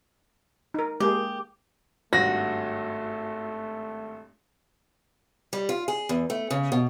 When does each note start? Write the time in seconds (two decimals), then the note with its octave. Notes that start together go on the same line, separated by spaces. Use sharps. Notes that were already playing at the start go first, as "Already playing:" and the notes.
0.74 D#4 A#4
1.00 G#3 A#3 G4 G#4
2.13 G#1 G2 A3 F#4 A#6
5.53 G3
5.69 F4
5.88 G#4
6.09 E2
6.30 A3
6.51 C#3
6.72 B2